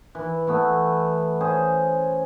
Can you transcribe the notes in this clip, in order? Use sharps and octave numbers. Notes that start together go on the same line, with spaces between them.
E3
E3 A3 B3
C#4 G#4 C5